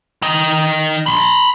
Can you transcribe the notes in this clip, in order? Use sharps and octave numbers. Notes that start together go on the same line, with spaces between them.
D#3 D#5
B5 C6